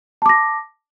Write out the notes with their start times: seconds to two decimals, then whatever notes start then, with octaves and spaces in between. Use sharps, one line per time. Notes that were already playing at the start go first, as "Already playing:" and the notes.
0.22 A5
0.26 D6
0.29 A#6